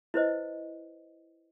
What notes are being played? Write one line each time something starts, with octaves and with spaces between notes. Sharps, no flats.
E4 B4 C5 D#5